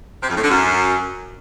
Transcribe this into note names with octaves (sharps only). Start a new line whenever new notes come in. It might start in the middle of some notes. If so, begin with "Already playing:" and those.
C3
F2
A2
D3
F#2